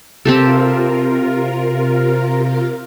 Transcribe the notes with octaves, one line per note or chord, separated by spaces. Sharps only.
C3 C4 F4 G4 A4 A#4